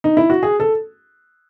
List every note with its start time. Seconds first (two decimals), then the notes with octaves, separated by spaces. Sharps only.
0.04 D#4
0.17 E4
0.30 F#4
0.43 G#4
0.60 A4